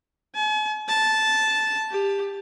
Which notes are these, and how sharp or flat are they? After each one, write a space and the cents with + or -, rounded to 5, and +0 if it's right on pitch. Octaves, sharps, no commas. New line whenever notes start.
G#5 +45
A5 -10
G4 +20